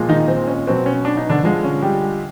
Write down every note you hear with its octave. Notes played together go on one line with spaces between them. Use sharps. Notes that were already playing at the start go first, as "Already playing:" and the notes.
Already playing: A#2 F3 G#3
D#3 D#4
C4
C#4
B2 F#3 C4
C#4
D4
D#4
D3 D4
D3 F3 G#3
C#4
G3 G4